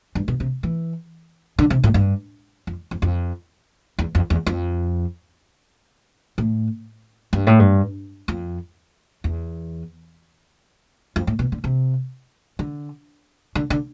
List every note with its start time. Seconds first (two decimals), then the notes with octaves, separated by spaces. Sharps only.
0.15 G2
0.28 B2
0.40 C3
0.63 E3
1.59 D3
1.70 C3
1.84 A2
1.94 G2
2.67 F2
2.91 F2
3.02 F2
3.99 E2
4.15 F2
4.30 E2
4.47 F2
6.38 A2
7.33 G2
7.47 A2
7.60 G2
8.28 F2
9.24 E2
11.16 F2
11.27 A2
11.39 B2
11.52 D3
11.64 C3
12.59 D3
13.55 D3
13.70 D3